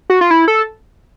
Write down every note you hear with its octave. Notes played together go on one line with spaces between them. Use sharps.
F#4
F4
E4
A4